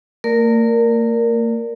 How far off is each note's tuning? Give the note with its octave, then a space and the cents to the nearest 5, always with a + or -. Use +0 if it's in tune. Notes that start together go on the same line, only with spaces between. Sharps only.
A#3 -45 A#4 +0 D5 +0